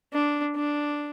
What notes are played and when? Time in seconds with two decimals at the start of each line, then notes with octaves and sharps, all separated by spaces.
0.13 D4
0.56 D4